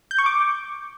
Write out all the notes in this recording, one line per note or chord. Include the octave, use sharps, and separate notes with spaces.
G6
C#6
D6